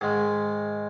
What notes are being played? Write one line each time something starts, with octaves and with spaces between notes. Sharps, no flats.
G#2 D#3 G#3